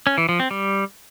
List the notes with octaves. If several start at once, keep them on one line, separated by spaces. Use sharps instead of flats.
C#4
E3
F3
C4
G3